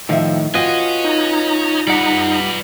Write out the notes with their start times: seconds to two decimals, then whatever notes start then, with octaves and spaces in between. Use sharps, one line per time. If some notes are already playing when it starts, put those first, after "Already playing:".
0.09 A2 D#3 F3 D#5 E5
0.54 F4 F#4 B4 C#5 D#5 G5 G#5
1.04 D#4 A#5
1.87 G3 B4 D5 F#5